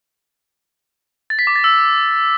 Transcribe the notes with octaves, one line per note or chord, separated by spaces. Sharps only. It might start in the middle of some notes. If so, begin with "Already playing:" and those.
A6
B6
D6
A6
E6